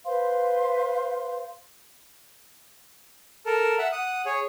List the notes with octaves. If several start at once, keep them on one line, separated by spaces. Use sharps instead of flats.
B4 C5 F5 C6
A4 A#4
E5 F#5
F#5 D#6
G#4 C#5